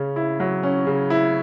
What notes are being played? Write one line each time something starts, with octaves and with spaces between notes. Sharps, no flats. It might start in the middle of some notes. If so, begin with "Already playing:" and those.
Already playing: C#3 C#4
E4
F#3
C#4
C#3
E4